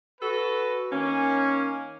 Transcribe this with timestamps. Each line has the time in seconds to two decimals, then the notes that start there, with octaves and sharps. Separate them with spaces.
0.21 F#4 A4 B4
0.92 D#3 A#3 C#4